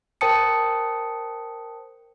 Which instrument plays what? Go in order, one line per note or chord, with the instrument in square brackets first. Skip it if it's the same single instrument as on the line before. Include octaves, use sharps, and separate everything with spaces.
[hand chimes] A#4 C5 G5 A5 D#6 C#7